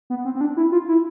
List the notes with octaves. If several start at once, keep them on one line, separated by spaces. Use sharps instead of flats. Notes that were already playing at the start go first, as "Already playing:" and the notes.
B3
C4
C4
D4
E4
F4
E4